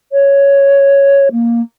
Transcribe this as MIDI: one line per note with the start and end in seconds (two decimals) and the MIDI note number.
0.12 1.28 73
1.31 1.61 58